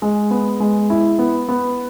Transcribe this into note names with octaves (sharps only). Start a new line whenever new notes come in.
G#3
B3
G#3
E4
B3
B3